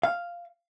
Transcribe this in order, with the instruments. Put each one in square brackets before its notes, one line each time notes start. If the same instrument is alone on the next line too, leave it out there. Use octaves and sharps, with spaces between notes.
[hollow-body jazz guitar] F5